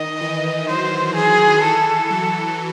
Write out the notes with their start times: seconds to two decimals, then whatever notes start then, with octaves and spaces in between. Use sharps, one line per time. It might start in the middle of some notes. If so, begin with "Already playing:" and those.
Already playing: D#3 D#5
0.21 E3
0.69 F#3 C5
1.16 E3 G#4
1.63 E3 A4
2.11 F#3